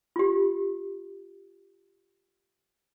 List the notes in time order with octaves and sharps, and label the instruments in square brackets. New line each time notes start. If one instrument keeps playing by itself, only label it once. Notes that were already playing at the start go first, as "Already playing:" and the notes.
[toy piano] F4 G4